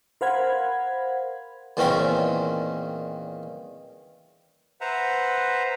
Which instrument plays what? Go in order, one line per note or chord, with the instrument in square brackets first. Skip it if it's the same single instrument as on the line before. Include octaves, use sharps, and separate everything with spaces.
[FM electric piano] A#4 C5 F5 F#5 B5 G#6
[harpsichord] E2 A#2 D#3 C4 C#4 B5
[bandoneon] B4 C5 E5 F#5 A#5